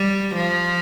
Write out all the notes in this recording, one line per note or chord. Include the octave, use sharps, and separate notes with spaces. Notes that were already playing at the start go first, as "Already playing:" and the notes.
Already playing: G3
F3